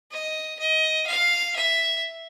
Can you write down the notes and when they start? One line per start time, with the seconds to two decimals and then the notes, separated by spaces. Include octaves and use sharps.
0.12 D#5
0.59 D#5
1.07 F5
1.56 E5